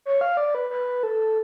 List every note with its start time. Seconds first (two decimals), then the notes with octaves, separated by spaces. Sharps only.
0.06 C#5
0.21 F5
0.37 D5
0.55 B4
0.70 B4
1.03 A4